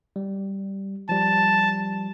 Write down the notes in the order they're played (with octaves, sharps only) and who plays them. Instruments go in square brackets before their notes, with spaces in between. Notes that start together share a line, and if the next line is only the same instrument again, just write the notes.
[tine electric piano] G3
[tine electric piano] F3 G3 [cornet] A5